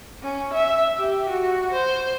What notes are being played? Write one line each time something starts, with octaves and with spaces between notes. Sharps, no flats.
C#4
E5
G4
F#4
C5